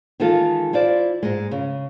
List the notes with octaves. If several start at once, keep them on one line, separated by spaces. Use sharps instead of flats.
D#3 E3 G#3 D#4 F4 A4
E4 F4 C5 D5
G#2 G#3
C#3